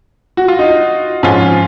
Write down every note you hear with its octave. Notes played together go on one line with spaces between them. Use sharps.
F#4
F4
D#4
G#2 F3 G#3 C#4 F4